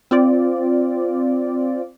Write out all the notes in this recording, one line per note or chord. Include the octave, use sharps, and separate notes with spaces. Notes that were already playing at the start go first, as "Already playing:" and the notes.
C4 F4 D5